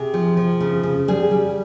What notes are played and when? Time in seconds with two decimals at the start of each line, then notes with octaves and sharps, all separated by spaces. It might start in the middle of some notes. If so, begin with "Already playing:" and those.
Already playing: C3 G#4
0.14 F3
0.37 F3
0.60 C#3
0.83 C#3
1.08 G3 G#4
1.31 G3